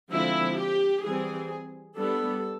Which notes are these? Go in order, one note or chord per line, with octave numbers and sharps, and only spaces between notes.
D3 F3 G#3 C4 E4
G4
E3 G3 C4 G#4
G3 B3 D4 A4